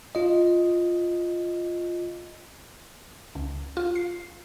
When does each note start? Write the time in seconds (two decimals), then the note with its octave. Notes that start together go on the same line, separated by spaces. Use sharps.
0.15 F4 D#5
3.35 C#2
3.77 F4
3.96 C7